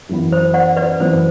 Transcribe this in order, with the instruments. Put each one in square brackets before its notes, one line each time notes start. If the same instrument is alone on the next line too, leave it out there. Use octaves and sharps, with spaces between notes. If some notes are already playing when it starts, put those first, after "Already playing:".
[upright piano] F#2 E3 B3
[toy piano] C5
D5 F#5
B4 D5
[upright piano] F#2 E3 B3 [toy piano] C5